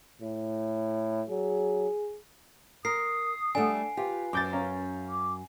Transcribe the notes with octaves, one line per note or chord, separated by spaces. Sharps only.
A2
F#3 G#4
A#4 D#6 C7
G3 A3 D4 A4 F#5 G#5
F4 G4 B4
F#2 D6 G6 A6
C#4 F5 A#5
D6